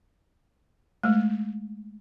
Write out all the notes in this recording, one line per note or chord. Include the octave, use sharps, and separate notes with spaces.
G#3 A3